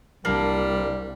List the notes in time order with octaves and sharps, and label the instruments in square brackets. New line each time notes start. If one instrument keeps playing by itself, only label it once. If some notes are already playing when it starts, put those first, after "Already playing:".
[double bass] C2 [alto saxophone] G3 [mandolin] A#3 D4